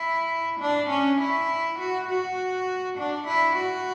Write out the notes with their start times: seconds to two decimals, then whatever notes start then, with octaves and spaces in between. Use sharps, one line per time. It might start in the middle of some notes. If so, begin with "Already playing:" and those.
Already playing: E4
0.60 D4
0.90 C#4
1.21 E4
1.79 F#4
2.08 F#4
2.98 D4
3.27 E4
3.57 F#4